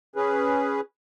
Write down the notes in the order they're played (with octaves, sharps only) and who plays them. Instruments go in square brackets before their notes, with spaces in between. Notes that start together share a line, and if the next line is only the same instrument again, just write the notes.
[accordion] C#4 G#4 B4